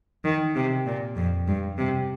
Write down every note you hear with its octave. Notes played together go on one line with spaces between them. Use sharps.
D#3
C3
A#2
F2
G2
C3